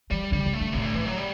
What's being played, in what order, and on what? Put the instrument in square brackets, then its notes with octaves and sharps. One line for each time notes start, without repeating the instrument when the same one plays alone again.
[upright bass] E3 [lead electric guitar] G3
[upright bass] D3 [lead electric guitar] G3
[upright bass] C3
[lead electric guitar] A3
[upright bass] D3
[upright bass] A2 [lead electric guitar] C3
[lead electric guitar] D3
E3
F#3
G3